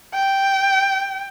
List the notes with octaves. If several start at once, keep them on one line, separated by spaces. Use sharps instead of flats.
G5